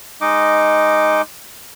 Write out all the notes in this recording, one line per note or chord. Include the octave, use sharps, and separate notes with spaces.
G#3 D#4 D#5 D6